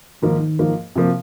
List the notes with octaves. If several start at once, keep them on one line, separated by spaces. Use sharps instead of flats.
G#2 D#3 F3 A#3
G#2 F3 A#3
C3 F3 A#3